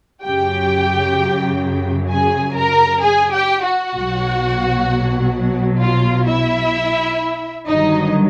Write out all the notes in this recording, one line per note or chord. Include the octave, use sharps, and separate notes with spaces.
F#2 C#3 F#3 G4 G5
G#4 G#5
A#4 A#5
G#4 G#5
G4 G5
F#4 F#5
B1 B2 F#3
F4 F5
E4 E5
G1 G2 D#3 F#3 D#4 D#5